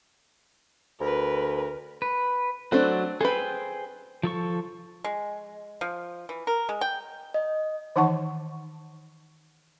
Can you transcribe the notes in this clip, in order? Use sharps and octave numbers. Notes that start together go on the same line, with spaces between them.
D2 A#4 B4
B4
F#3 A3 C4 D4 F#4
G#4 A4 B4 C5 G5
F3 A4 C#6
G#3
F3
E3
A#4
G#3
G5
D#5
D#3 E3 D#4 F#5 A5 C#6